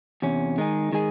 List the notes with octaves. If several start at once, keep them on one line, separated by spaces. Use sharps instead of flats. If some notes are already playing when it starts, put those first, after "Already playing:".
E2 C3 C#4
D#3 G#3 D#4 G#4
D#3 G#3 D#4 G#4